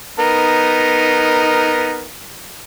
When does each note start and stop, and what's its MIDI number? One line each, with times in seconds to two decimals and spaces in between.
0.19 2.05 59
0.19 2.05 63
0.19 2.05 70